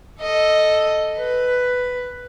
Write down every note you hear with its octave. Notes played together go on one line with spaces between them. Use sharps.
A4 D#5
B4